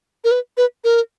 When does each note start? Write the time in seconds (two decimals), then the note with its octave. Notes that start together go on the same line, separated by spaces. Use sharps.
0.24 A#4
0.31 B4
0.57 B4
0.84 A#4